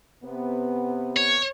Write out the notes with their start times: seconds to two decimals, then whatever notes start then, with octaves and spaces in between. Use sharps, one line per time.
0.24 C3 B3
1.17 C#5